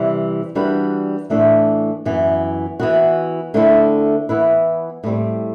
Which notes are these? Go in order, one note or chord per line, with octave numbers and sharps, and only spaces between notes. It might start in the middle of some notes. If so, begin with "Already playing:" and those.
Already playing: C3 E3 G3
E3 G3 D4 F#4 B4
A2 E3 A3 D4 A4
F#2 E3 B3
E3 B3 F#4
D3 A3 C4 E4
E3 B3 E4 B4
A2 G3 C4